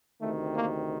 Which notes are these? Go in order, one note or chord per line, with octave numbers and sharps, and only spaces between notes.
D2 C3 D#3 A3
A#3